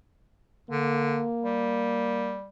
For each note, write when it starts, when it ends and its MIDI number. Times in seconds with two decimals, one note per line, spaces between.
0.70 1.25 50
0.70 2.36 58
1.42 2.48 55